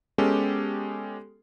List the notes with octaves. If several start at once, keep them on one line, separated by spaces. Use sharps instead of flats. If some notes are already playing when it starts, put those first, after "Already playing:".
G#3 B3 C#4 G4 A4